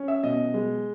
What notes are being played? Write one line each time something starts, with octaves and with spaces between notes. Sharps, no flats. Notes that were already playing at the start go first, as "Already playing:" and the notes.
Already playing: C#4
E5
B2 D#5
G#3